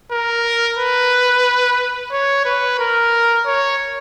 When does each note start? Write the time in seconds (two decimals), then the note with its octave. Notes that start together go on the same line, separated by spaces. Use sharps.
0.11 A#4
0.78 B4
2.11 C#5
2.45 B4
2.79 A#4
3.46 C#5